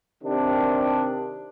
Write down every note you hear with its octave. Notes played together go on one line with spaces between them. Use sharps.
C3 D#3 D4